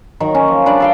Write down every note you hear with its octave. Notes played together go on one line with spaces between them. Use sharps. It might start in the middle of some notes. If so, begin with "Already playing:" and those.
D#3 F#3 A#4
C#4
F3
G3 D4 B4 D5
A4 F5 G5